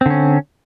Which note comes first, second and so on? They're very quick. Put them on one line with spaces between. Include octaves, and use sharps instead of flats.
C4 D3 C#4